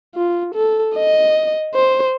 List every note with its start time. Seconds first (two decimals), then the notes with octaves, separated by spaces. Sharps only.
0.15 F4
0.55 A4
0.96 D#5
1.75 C5